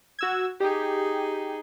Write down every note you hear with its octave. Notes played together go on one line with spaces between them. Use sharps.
F#4 E6 G#6
D#4 G4 G#4